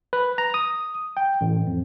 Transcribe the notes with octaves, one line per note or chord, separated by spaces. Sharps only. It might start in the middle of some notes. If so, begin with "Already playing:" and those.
B4
A#5
D#6
G5
A1
F2